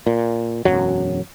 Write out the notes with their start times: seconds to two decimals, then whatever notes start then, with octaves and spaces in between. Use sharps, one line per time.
0.07 A#2
0.65 E1 C2 F#2 F#3